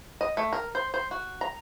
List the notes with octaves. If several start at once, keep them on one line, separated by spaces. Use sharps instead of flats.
D#5
A3
A#4
C5
C5
F#4
A#5